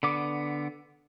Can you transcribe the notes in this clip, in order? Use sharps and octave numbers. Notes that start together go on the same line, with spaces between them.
D3 B3 D6